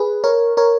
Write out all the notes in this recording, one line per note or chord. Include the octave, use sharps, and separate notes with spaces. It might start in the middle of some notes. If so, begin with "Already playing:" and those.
Already playing: G#4 B4
A#4 C#5
A#4 C#5